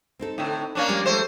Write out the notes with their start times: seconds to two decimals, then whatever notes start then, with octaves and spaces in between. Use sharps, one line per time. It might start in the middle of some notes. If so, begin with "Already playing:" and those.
0.19 C4 D#4 A4
0.38 A2 D3
0.75 A#3 C#4 D4
0.89 F3 G3 G#3
1.06 A3 C5